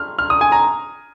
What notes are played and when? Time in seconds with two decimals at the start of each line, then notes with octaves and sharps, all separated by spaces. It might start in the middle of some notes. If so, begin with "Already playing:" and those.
Already playing: F6
0.19 F6
0.30 D#6
0.41 G#5
0.52 A#5